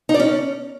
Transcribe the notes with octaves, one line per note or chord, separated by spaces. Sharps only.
D#4
D5
C#4